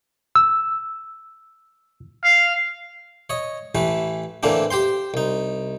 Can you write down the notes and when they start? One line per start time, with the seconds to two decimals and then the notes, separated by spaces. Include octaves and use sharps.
0.35 E6
2.24 F5
3.30 C#5 D#5
3.75 A1 E3 A3 B4
4.43 A2 D3 E3 A#3 C4 D4
4.71 G4 C5 G5 C6
5.14 C2 D#4